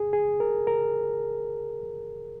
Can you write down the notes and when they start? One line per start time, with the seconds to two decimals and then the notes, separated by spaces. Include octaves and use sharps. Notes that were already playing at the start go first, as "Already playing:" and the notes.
Already playing: G#4
0.13 G#4
0.40 A#4
0.67 A#4